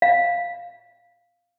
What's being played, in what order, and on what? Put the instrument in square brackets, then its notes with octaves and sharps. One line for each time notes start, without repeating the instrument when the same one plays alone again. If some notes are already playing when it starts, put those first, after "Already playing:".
[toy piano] F5